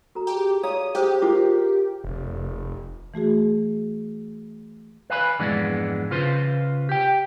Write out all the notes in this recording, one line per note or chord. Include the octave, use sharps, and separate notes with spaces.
F#4 A4 A#5
G4 G#4 A5 A#5
C#5 D5 F5 A#5 D#6
G4 G#4 C5 G5 D#6
F4 A#4 D6
F1
E3 A3 F#4 G#4
B4 F5 G#5 B5
F2 G#2 E3 G#3 B3 D4
C#3 F4 B4 C5
G4 G5